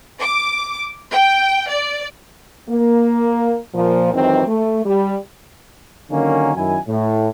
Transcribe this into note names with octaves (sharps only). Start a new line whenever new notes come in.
D6
G5
D5
A#3
A#2 F3
F2 G#2 D#3 E3 F#3 C4
A3
G3
D3 D#3 F#3 A#3 C#4
F#2 D#3 E4 G#5
A2